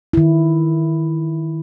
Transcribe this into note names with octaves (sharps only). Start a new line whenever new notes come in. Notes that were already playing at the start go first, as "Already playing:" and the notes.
D#3 E4